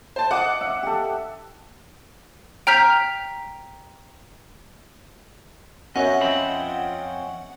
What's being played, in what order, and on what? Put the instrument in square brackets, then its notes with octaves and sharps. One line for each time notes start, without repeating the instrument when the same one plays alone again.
[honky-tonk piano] C5 A5
[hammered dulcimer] D#5 [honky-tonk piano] F#5 D6
[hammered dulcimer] E5
G4 A4
[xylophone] G5 A#5 F6 G6 B6 F7
[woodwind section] F#2 [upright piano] C#4 C#5 E5 [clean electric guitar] D#5 [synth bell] F#5
[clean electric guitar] F2 C4 B5 [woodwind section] F4 D#5 G5